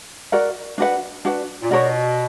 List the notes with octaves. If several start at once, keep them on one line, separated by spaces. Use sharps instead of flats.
F#4 A#4 D5 F#5
D4 F#4 B4 F#5
D4 F#4 B4 F#5
A#2
B2 D4 F#4 A#4 C#5